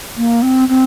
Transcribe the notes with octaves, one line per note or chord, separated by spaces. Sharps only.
A#3
C4
C4